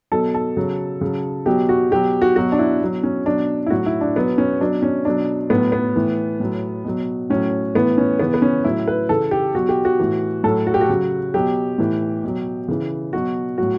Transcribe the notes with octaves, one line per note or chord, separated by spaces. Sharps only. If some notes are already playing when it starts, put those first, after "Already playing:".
B2 F#3 A4
A4
C#3 F#3
C#3 F#3
B2 F#3 G4
F#4
B2 F#3 G4
F#4
B2 F#3 F#4
D4
E4
B2 F#3
C#4
B2 F#3 D4
E4
A2 F#3 F#4
E4
D4
B2 F#3 B3
C#4
B2 F#3 D4
C#4
B2 F#3 D4
A2 F#3 B3
B3
A2 E3
A2 F#3
B2 F#3
A2 F#3 C#4
A2 E3 B3
C#4
C#3 E3 B3
B3
C#4
A2 F#3 E4
B4
C#3 E3 A4
G4
B2 F#3 F#4
G4
F#4
A2 E3
A2 F#3 A4
F#4
G4
F#4
C#3 F#3
B2 F#3 G4
A2 E3
B2 F#3
C#3 E3
B2 F#3 F#4
A2 F#3 F#4